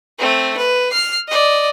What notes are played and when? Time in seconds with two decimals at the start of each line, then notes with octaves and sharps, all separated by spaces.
0.19 A3 C4
0.57 B4
0.92 F6 C7
1.28 D5 D#5